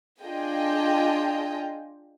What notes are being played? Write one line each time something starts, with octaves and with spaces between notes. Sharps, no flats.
D4 F4 G#4 D#5 G5